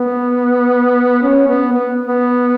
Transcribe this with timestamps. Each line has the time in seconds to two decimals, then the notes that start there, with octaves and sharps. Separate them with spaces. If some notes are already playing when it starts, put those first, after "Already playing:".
Already playing: B3
1.23 C#4
1.48 B3
1.73 B3
2.06 B3